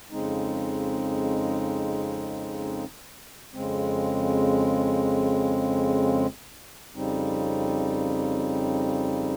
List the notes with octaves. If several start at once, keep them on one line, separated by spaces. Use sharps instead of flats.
F2 C#3 G#3 C4 D#4
F2 C#3 G#3 C4
F2 C#3 G3 C4 D#4